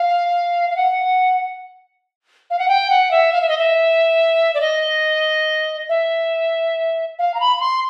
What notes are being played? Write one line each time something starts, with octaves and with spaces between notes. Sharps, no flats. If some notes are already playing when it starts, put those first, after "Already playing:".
Already playing: F5
F5
F#5
F5
F#5
G5
F#5
E5
F5
E5
D#5
E5
D5
D#5
E5
F5
A#5
B5
B5
C6